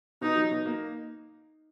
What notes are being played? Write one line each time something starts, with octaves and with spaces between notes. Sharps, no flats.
B2 D#4
F#3
B2
A#3